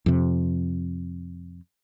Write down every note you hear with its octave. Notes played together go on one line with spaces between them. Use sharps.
F2 C3